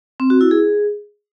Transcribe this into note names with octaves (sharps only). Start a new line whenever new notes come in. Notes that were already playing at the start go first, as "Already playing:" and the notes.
C4
F#4
E4
G#4